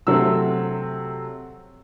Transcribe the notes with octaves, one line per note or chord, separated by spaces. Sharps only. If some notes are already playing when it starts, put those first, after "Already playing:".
C3 F#3 A3 C4 E6